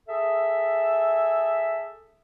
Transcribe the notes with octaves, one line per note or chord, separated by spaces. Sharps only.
G#4 A4 E5